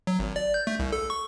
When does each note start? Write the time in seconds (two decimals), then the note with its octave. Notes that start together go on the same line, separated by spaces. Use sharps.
0.07 F#3
0.19 G#1
0.36 D5
0.54 G6
0.67 A3
0.79 C2
0.93 A4
1.10 C#6